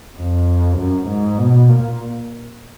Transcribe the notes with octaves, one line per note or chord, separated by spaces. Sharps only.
F2
F#2
G#2
B2
A#2